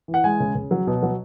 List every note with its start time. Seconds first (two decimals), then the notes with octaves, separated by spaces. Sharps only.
0.08 E3
0.14 F#5
0.24 G#3 G#5
0.40 C#3
0.55 C#3
0.71 F#3
0.87 B2
1.02 F#3